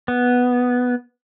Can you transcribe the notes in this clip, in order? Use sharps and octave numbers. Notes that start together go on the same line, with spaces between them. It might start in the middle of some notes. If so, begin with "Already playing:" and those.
B3